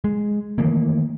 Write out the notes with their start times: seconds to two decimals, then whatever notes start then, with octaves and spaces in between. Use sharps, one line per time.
0.04 G#3
0.58 D#3 E3 A3 A#3